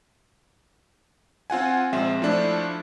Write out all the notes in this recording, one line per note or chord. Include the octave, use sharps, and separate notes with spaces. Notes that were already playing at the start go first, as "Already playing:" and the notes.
C4 F4 F#5 G#5
A#1 G#3 C4 E5
F3 A3 D4 E4